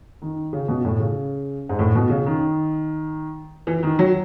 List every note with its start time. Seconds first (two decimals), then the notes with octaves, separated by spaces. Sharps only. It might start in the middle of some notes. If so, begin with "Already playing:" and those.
0.22 D#3
0.53 C#3
0.68 B2
0.85 A2
1.00 C#3
1.69 G#2
1.79 A2
1.95 B2
2.10 C#3
2.26 D#3
3.67 E3
3.83 D#3
3.99 F#3